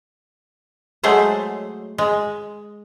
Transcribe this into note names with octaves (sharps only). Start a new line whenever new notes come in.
F#3 G#3 A3 G#4 C5
G#3